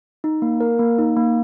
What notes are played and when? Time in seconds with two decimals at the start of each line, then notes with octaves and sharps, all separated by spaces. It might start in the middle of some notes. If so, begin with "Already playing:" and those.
0.24 D#4
0.42 A#3
0.60 A#4
0.79 A#3
0.98 D#4
1.16 A#3